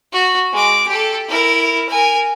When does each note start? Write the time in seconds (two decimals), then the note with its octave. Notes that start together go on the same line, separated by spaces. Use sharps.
0.12 F#4
0.53 G#3 D6
0.87 G4 A4
1.28 E4 A#4
1.89 A#4 G#5